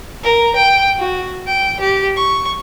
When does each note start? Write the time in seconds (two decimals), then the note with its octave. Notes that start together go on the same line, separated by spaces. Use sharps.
0.23 A#4
0.55 G5
0.97 F#4
1.47 G5
1.80 G4
2.16 C#6